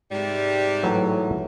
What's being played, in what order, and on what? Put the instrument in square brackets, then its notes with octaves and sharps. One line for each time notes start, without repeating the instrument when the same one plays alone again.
[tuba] G#2 [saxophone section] C3 G3
[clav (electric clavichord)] A2 E3 F#3